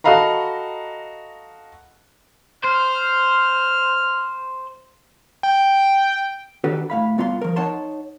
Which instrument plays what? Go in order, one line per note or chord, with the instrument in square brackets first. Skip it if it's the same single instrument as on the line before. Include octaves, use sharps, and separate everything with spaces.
[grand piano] F#4 A4 D#5 F5 A#5 B5
[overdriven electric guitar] C5 [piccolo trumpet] F6
[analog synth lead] G5
[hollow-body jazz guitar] D#3 D4 F#4 G4 A4 B4
A2 F5 B5
C2 B3 F4 F5 A#5 C6
F3 A#4
D#4 C#5 F#5 A5 C6